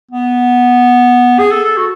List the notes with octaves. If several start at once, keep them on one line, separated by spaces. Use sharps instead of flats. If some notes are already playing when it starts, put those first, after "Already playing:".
B3
G#4
A4
A4
F#4